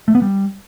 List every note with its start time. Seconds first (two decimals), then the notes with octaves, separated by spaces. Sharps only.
0.08 A3
0.15 B3
0.22 G3